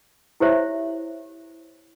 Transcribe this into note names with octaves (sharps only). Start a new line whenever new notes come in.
E4 G4 C5 C#5 E5